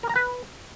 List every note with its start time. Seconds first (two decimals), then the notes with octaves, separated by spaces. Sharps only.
0.03 A#4
0.09 A#5
0.16 B4